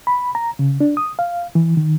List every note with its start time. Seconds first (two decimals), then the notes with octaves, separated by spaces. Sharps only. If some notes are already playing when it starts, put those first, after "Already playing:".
0.07 B5
0.35 A#5
0.59 C#3
0.81 D4
0.97 D#6
1.19 F5
1.55 E3
1.77 D#3